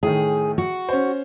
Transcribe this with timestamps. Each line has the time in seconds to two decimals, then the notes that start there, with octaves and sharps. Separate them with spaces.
0.03 A2 D#3 G#4
0.58 F#4
0.89 C#4 C5